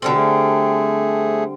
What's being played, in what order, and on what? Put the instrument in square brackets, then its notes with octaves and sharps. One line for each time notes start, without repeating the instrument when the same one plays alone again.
[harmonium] B2 A4 [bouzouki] D3 G3 C4
[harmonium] A3 G#4